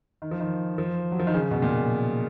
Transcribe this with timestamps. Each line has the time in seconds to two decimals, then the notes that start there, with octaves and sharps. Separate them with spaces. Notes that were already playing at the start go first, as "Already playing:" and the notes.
0.22 D#3
0.31 F3
0.40 D#3
0.78 F3
1.12 F#3
1.19 F3
1.27 D#3
1.34 C#3
1.51 B2
1.62 A#2